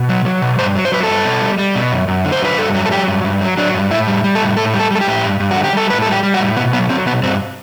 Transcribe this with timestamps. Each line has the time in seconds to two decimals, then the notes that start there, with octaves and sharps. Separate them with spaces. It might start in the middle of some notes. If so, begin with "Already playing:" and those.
Already playing: B2
0.09 F#3
0.25 F#3
0.42 B2
0.59 G2 C5
0.76 F#3
0.85 C5
0.92 F#3 B4
1.03 G2 A4
1.25 B2
1.41 G3
1.58 G3
1.75 B2
1.92 F#2
2.08 F#2
2.25 D3
2.32 C5
2.41 F#3 B4
2.58 G2 A4
2.74 F#3
2.86 A4
2.91 F#3 G4
3.08 G2
3.24 G2
3.41 F#3
3.57 F#3 D4
3.74 G2
3.91 A2 E4
4.07 G3
4.24 G3
4.35 A4
4.41 A2
4.57 A2 A4
4.74 G3
4.79 A4
4.91 G3 A4
5.01 G4
5.07 A2
5.24 G2
5.40 G2
5.51 F#4
5.57 D3
5.64 G4
5.73 G3 A4
5.90 A2 B4
6.02 G3 A4
6.12 G4
6.23 G3
6.34 F#4
6.40 A2
6.57 B2 B3
6.73 F#3 B3
6.89 F#3 C4
7.06 B2 B3
7.23 G2 C4